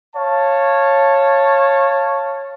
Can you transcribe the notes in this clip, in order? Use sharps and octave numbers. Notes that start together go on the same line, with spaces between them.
C#5 F5 A5